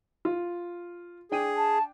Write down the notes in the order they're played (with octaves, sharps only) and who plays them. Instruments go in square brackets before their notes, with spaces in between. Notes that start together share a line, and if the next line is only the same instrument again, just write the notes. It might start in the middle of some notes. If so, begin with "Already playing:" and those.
[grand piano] F4
[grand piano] D4 G5 D#7 [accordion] G#4
[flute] A5